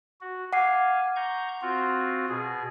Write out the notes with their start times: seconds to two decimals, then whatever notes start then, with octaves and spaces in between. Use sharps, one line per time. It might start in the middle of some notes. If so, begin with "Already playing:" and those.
0.21 F#4
0.53 F5 F#5 G#5 D6 C7
1.16 A#5 C#6 G6
1.62 C4 F4 F#4
2.29 B2 G#4